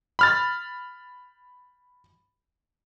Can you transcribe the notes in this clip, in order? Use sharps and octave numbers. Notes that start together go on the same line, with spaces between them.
B5 F6 A6